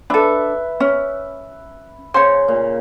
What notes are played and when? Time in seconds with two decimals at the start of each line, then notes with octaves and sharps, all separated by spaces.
0.10 D4 A4 B4 E5
0.80 C#4
2.14 C#3 C5 C#5
2.48 A#2